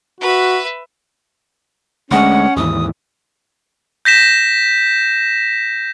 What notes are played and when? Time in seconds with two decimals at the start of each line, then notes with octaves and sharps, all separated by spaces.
0.20 F#4 B4 E5
2.11 D2 G#3 C#4 F#5
2.57 D#2 G#2 E3 D#6
4.05 G6 A#6 B6 E7